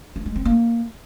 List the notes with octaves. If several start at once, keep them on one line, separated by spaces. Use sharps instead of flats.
D4
G#3
C4
A#3